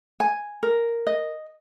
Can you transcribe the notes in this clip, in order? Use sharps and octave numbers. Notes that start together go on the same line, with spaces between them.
G#5
A#4
D#5